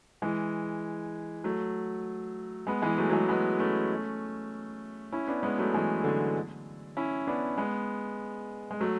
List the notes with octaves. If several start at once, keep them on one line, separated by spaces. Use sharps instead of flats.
E3 G#3
F#3 A3
G#3 B3
E3 G#3
F#3 A3
F#3
E3 G#3
G#3 B3
A3 C#4
C#4 E4
B3 D4
G#3 B3
F#3 A3
E3 G#3
D3 F#3
C#4 E4
B3 D4
G#3 B3
G#3
F#3 A3